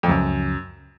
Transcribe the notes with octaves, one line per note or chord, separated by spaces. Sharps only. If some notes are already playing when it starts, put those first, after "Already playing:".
F2
C#2 F#2 C#3 F3